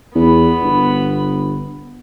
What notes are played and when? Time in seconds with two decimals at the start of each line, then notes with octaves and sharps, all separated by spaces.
0.15 E2 B3 B5
0.63 G1